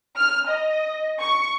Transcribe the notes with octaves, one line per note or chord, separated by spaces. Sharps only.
F6
D#5
C#6